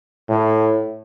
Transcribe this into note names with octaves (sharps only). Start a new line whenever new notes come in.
A2